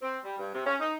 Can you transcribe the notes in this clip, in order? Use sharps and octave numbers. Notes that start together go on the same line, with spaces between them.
C4
G3
G2
C3
C#4
D#4